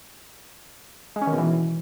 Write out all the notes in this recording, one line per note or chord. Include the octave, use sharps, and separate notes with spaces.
G#3
C#4
D#3
B2
E3